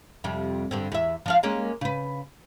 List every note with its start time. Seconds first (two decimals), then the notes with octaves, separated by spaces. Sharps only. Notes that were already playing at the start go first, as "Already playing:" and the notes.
0.24 F2 C3 G3
0.71 G2 D3 C4
0.92 E2 E5
1.26 F3 D4 F5
1.43 G#3 A#3 C#4
1.81 C#3 B4